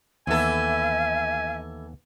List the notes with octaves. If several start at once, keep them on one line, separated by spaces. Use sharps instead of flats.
D#2 E3 B3 A4 E5 G#5